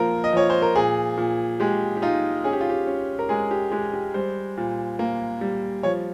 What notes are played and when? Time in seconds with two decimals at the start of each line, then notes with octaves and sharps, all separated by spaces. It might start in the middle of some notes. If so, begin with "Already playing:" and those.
Already playing: F3 A#3 A#4 C5
0.24 D#5
0.32 F3 C#5
0.50 C5
0.62 A#4
0.75 A#2 G#4
1.17 A#2
1.60 G#3 G4
1.97 G4
2.02 D#4 F4
2.44 C#4 G#4
2.53 G4
2.61 F4
2.70 G4
2.87 C#4
3.19 A#4
3.29 G#3 G#4
3.51 G4
3.72 G#3 G4
3.93 G4
4.14 G3 C5
4.57 A#2
4.99 A#3
5.41 G3
5.83 F3 C#5